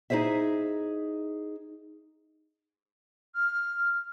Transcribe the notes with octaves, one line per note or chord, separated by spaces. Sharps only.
D#4 E4 G#4 C5 E5
F6